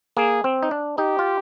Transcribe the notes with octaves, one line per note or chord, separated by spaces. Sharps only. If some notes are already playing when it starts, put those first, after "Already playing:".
A#3 G#4
C4
D#4
D4
D#4 G4
F4